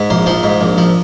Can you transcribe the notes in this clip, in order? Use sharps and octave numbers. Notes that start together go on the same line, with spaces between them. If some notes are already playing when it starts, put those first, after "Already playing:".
Already playing: G#2
A#1 C5
F3 C5
G#2
A#1
F3